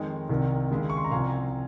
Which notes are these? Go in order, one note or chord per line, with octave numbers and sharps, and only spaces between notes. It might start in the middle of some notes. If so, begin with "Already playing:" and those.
Already playing: F2 D#3 G#3 C#5
C2 C3 D#3
D#2 C#3 G#3
C#6
C6
A#5
C2 C3 F3 F5 G#5